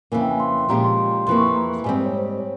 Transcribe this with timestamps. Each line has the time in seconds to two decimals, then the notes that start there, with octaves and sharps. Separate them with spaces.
0.12 F2 C#3 E3 A#3 G#5
0.21 G5
0.31 G#5
0.40 C6
0.69 A#2 F3 G#3 C#4 G4 A#5
0.84 C6
1.27 F2 E3 A#3 C6
1.37 C#6
1.46 C6
1.56 A#5
1.84 G#2 G3 C4 G#5
2.04 C#5
2.14 C5
2.38 C#5